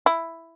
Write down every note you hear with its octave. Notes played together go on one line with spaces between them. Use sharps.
E4